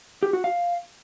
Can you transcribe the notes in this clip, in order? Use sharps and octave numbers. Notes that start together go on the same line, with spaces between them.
G4
F#4
F5